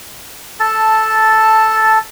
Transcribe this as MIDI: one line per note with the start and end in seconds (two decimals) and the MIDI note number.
0.60 1.99 69
0.60 1.99 81